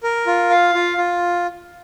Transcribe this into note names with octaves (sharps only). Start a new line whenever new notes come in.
A#4
F4
F5
F4
F4